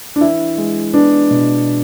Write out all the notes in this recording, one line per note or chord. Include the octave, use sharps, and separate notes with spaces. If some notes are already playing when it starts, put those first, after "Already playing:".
D4
E3 E4
G#3
B3 D4
B2